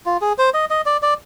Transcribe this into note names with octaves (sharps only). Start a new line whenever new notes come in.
F4
G#4
C5
D#5
D#5
D5
D5